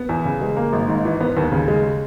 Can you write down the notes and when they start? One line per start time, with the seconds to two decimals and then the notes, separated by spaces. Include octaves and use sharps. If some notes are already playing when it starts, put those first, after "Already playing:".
Already playing: B3
0.09 E2
0.25 C#3
0.41 G#3
0.57 A#3
0.73 G#1
0.88 G#2
1.05 E3
1.20 B3
1.37 D#2
1.52 C#3
1.68 G#3